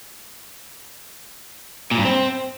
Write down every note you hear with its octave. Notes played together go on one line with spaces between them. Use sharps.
A#2
G2
C4